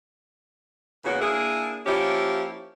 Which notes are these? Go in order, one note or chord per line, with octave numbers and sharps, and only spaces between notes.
E2 C#3 A#3 B3 F#4 C#5
A#3 D4 E4 G#4
F3 A#3 C#4 E4 G4